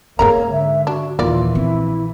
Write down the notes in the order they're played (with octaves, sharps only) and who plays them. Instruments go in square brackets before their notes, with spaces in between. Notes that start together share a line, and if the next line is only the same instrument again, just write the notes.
[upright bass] G#2 C#3 [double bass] A#3 [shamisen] G#4 A#4 A#5 [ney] C#5
[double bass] D3 [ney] E5
[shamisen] D4 [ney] F#4
[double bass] A#1 E3 [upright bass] D#2 [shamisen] A#3 D5 [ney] F4
[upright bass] C4 [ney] E4